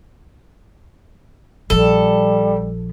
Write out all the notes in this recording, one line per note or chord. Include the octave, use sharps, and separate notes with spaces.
A#1 F3 G3 A4